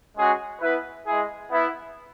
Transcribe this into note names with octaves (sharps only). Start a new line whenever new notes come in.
G#3 C#4 F#4 G#4
B3 E4 B4
G#3 E4 G#4
B3 E4